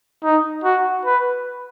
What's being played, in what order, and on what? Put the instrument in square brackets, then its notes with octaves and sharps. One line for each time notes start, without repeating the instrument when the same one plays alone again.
[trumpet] D#4
F#4
B4